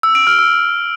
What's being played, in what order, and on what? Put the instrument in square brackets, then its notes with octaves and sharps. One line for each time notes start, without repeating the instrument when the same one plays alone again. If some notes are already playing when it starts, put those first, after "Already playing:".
[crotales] E6
D7
F6
E6